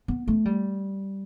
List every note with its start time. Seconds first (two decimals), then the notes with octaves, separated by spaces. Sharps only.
0.08 B3
0.28 A3
0.45 G3